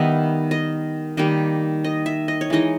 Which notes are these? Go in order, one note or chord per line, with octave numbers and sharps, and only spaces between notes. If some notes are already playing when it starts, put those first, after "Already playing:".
Already playing: D#3 G3 B3 D#4 E5
D#5
D#3 G3 A#3 D#4
D#5
E5
D#5
C#5
E3 G#3 D#4 D#5